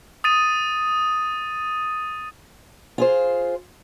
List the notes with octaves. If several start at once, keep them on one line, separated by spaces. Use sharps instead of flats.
D#6 A6 D#7
F4 G#4 C5